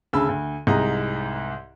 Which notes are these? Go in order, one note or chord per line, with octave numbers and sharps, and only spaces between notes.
D2 C#3 A5 B5 E6
D2
C2 G#2 D#5 A#5